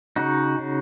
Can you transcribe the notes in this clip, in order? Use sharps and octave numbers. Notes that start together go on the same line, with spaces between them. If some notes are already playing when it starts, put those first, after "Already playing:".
C#3 D#4 F#4
C#3